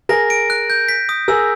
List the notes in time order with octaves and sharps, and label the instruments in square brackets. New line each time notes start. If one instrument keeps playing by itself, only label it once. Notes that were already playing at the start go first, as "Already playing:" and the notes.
[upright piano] G#4 A#4 [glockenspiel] A#6
[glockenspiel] D7
F#6
G6
B6
D#6
[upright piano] G#4 A#4 [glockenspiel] E6